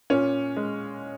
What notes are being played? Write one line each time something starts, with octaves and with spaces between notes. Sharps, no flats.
A#2 C#4
G#3